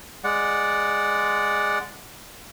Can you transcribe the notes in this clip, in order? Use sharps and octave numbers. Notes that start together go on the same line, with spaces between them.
G#3 D5 F#5